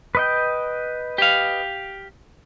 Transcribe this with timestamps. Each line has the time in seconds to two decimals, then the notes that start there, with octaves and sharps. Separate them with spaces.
0.15 B4 D#5 G5
1.18 G4 F5